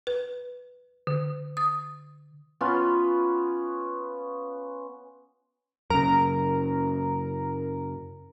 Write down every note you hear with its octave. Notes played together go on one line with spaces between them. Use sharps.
B4
D3
D#6
B3 C#4 F4
F#2 C#3 A#4